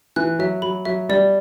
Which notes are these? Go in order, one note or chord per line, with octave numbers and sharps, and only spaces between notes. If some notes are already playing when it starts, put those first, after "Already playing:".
E3 F#6
F#3 E5
F#3 B5
F#3 E5
G3 D5